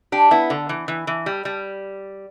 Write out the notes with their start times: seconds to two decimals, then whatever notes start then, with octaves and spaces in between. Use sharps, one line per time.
0.12 D4 G4
0.31 B3 E4
0.50 D3
0.69 E3
0.88 E3
1.07 E3
1.26 G3
1.45 G3